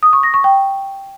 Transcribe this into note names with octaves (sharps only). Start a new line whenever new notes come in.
D#6
C#6
A#6
C#6
G5